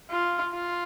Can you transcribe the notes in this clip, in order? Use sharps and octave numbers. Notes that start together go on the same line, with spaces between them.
F4
F4